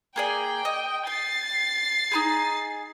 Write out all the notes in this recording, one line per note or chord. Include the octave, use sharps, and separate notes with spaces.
A#3 G#4 D5 G5
D#5
G5 A6 C7
D#4 E4 G#4